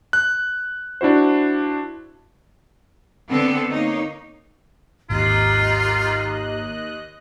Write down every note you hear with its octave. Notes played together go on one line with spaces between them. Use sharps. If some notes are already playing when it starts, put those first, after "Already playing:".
F#6
D4 E4 F#4 C5
D3 B3 C4 A4
A#3 D#4 C#5
G#1 D#2 F4 G4 D#5 A#5 F#6